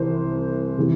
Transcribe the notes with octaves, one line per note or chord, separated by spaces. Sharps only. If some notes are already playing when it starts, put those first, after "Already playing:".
Already playing: C2 C3 E3 C5
C3 E3